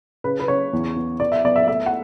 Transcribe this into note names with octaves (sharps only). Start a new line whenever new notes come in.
C#3 B4
B4
C#3 C#5
E2
B3
B3 D5
E5
B3 D5
E5
A3 E5
F#5